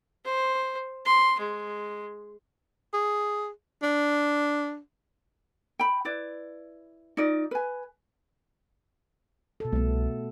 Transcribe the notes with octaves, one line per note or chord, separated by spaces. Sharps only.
C5
C6
G#3
G#4
D4
G5 B5
E4 B4 D5
D#4 F4 D5 D#5
B4 G#5
B2 A4
C2 A3 B3